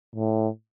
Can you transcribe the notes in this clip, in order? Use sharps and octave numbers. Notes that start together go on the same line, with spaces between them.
A2